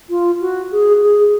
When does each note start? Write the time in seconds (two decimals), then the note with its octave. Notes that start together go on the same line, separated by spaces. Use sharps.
0.10 F4
0.41 F#4
0.72 G#4
1.02 G#4